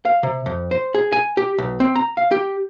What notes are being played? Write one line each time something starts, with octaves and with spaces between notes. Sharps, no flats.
F5
C3
F2
C5
G#4
G#5
G4
B1
C4
A#5
F5
G4